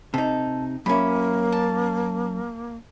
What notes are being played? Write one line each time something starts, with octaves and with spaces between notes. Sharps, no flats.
C3 D#4 A4
F#2 A#3 C#4 E4 B5
A5